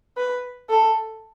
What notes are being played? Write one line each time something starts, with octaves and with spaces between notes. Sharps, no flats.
B4
A4